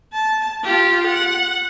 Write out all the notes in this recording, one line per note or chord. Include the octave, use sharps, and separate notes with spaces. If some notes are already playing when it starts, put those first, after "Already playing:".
A5
F4 G4
F#5